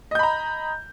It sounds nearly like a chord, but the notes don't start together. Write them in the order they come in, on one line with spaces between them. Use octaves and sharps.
D#5 G6 B5 A#5